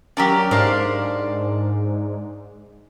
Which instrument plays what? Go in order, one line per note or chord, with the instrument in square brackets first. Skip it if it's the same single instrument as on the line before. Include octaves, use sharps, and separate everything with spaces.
[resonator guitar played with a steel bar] F#3 C#4 [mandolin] G4 A#4 D5
[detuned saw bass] G#2 [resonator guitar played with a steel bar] D4 A#4 C5 [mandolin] D5 F5